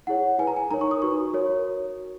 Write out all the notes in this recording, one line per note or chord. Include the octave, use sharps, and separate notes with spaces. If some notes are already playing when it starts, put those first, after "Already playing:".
E4 G#4 C#5 F#5
E4 B4 G#5
A#5
G#5
D#4 A#4 C#5 A#5
C#6
D#6
D#4 F#4 B4 C#6
F#4 A#4 C#5